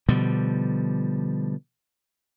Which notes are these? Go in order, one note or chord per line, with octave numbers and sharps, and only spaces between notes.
B2 D3 F3 G3